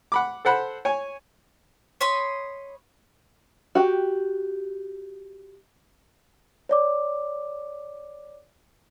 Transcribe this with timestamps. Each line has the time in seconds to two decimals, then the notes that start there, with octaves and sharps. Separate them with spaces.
0.12 F#5 B5 D6
0.45 A4 C5 F#5 B5
0.85 C#5 G#5
2.01 C#5 D#5 B5 C6
3.75 F#4 G4
6.69 C#5 D5 D6